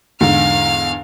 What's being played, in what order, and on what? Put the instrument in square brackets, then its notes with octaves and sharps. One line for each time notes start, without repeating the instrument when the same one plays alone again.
[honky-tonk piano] E2 G#2 D3 [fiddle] F5 F6